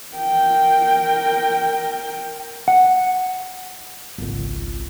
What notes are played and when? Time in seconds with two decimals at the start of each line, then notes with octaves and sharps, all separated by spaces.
0.15 A#4 G5
2.68 F#5
4.18 G#1 C#2